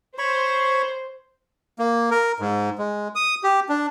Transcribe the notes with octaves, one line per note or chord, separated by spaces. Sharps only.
C5 C#5 B5 C#6
A#3
A#4
G#2
G#3
D#6
G4
D4